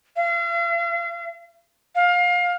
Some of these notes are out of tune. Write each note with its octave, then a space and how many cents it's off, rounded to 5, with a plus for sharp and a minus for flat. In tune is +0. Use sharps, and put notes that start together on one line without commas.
F5 -40
F5 +25